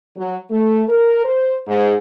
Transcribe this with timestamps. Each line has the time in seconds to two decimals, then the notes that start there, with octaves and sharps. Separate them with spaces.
0.17 F#3
0.51 A3
0.89 A#4
1.25 C5
1.68 G#2